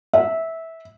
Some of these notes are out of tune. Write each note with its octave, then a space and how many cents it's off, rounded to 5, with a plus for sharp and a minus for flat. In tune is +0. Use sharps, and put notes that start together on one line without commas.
E5 -15